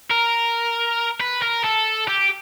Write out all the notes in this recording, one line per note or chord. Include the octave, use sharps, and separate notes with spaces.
A#4
B4
A#4
A4
G4